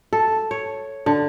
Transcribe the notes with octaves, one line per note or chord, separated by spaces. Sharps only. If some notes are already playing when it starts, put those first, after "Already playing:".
A4
C#5
D3